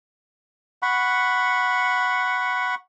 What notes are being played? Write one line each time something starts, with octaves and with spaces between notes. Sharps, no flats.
F#5 B5 C#6